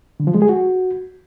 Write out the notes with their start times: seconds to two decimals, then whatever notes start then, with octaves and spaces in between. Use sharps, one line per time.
0.20 D3
0.27 F3
0.34 G#3
0.42 G#4
0.49 F#4